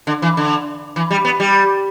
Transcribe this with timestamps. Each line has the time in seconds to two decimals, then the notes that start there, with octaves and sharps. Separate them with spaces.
0.07 D3
0.22 E3
0.37 D3
0.96 E3
1.11 G3
1.25 B3
1.40 G3